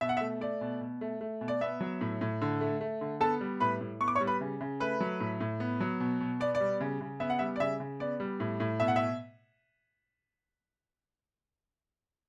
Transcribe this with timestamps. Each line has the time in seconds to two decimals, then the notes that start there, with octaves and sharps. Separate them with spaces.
0.01 B2 E5
0.09 F#5
0.17 E5
0.21 A3
0.41 A3 D5
0.61 B2
0.81 B2
1.01 A3
1.21 A3
1.41 B2
1.48 D5
1.61 B3 E5
1.80 F#3
2.01 A2
2.21 A2
2.41 D3
2.61 A3
2.81 A3
3.01 D3
3.20 B3 A4 A5
3.41 G3
3.60 A2 B4 B5
3.81 A2
4.01 B3 C#6
4.08 D6
4.15 C#5 C#6
4.21 G3
4.27 B4 B5
4.41 C#3
4.61 C#3
4.80 A3 B4 B5
5.00 F#3
5.20 A2
5.40 A2
5.60 B3
5.80 F#3
6.00 B2
6.21 B2
6.40 B3 D5
6.55 D5
6.60 G3
6.80 C#3
7.01 C#3
7.20 B3 E5
7.30 F#5
7.39 G3 E5
7.56 D5
7.60 C#3 E5
7.80 C#3
8.00 B3 D5
8.20 G3
8.40 A2
8.60 A2
8.80 B2 E5
8.88 F#5
8.96 E5